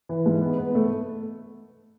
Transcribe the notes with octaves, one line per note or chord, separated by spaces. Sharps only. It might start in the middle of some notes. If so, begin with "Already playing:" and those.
E3
G#2
B3
B3
A3